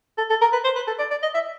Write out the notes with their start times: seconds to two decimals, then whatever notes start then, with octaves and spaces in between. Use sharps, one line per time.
0.18 A4
0.30 A4
0.42 A#4
0.53 B4
0.64 C5
0.76 B4
0.88 A4
0.99 D5
1.11 D5
1.23 D#5
1.34 E5